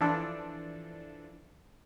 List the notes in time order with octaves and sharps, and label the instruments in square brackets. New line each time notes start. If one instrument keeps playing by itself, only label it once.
[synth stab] E3 F3 D4 A4